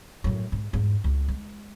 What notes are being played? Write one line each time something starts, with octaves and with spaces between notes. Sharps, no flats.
F#2 A2
G#2
E2 G#2
C#2
G#3